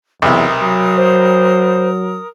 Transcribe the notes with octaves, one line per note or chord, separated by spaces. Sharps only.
B1 E2 C3 A#4 D#6
F#3
C5